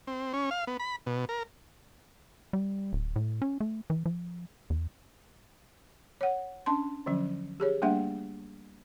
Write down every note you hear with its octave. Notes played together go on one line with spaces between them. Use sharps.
C4
C#4
F5
B3
B5
B2
A#4
G3
D1
A2
C#4
A3
E3
F3
E2
C#5 F#5
C#4 D4 A5 C6
D3 F3 F#3 C#4
G4 G#4 C#5
G3 A3 A#3 D4 E5 F#5